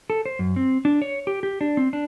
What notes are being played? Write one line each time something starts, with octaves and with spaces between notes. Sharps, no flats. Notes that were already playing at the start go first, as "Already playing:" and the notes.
A4
C5
F#2
C4
D4
C#5
G4
G4
D4
C4
D4